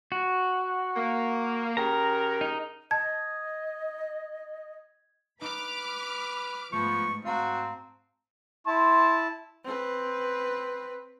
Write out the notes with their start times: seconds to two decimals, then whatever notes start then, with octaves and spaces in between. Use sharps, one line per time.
0.12 F#4
0.96 A#3
1.77 C#3 G4 A#4 A#5
2.41 D#4
2.91 D#5 A5 G#6
5.41 D#4 B4 B5 D6 F6
6.73 G#2 F3 A3 B3 C#6
7.25 C4 F#4 F5 A5 A#5
8.67 E4 A5 C6
9.64 C4 B4